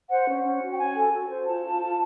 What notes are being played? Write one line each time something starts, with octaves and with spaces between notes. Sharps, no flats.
C5 F#5
C#4
C#4
F#4
G5
C#4 G#5
A4
F#4
C5
F4 A5
F4
F4